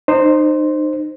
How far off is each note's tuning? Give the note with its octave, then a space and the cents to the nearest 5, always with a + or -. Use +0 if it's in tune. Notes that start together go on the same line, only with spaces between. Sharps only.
D#4 -30 C5 +0